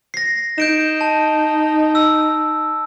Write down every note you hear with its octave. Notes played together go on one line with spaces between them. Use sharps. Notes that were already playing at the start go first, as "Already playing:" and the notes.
A#6 C7
D#4 G6 D7 E7
A5
E6